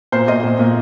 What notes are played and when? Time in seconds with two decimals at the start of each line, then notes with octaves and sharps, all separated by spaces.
0.12 A#2 C5
0.28 A#2 D#5
0.43 A#2
0.59 A#2